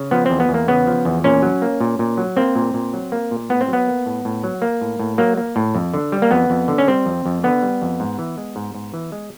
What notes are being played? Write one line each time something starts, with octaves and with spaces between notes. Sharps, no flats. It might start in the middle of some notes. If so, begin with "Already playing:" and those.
Already playing: C#3
F3 B3
E2 C4
B3
E2
A#3
C#3 B3
F3
E2
A#2 C#4
F#3
A#3
A#2
A#2
F#3
A#3 C4
A#2
A#2
F#3
A#3
A#2
A2 B3
C4
F#3
B3
A#3
A2
A2
F#3
A#3
A2
A2
F#3 A#3
A#3
A2
F2
D3
G3
A#3
F2 B3
F2
D3
C#4
G3 C4
F2
F2
D3 B3
G3
F2
G#2
E3
G#3
G#2
G#2
E3
G#3